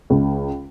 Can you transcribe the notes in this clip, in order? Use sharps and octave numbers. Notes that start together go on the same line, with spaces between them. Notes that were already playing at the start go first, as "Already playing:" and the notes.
C#2